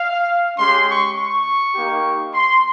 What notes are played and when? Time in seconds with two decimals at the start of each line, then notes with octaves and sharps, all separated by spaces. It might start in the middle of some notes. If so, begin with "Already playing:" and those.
Already playing: F5
0.58 G#3 C#4 G4 C6
0.88 C#6
1.17 C#6
1.75 A#3 D#4 G4
2.34 C6